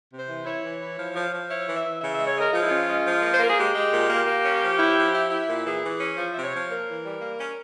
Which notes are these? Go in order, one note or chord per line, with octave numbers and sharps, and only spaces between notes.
C3
C5
E3
E4 C#5
E3
E4
F3
F3
F3
E4 C#5
E3
E5
E3
C#3 E5
G#3 E5
C#5
G#3 A#4
F3 F4
E4
C#4 F4
G#3
F3
A#3
C5
A#3 A#4
G#4
G#3 G4
G#3
A#2
A#3
A#3
C#4
F3
E4
F3
E4
E4
A#2
E3 G#4
E3
C#4
F3 C5
C3 E5
C#5
F3
A#3 A#4
E3
G3
A#3
C#4